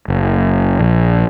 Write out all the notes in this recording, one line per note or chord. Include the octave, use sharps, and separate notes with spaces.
F#1
A#1